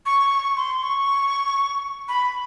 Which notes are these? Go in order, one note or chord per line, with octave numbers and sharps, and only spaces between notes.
C#6
C6
C#6
B5